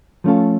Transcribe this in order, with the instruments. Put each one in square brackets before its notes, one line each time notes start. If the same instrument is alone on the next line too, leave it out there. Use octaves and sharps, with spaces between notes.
[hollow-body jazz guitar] F3 A3 C#4 F4 A4